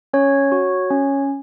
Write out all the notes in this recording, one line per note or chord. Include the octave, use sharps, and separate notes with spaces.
C#4 C#5
F#4
C#4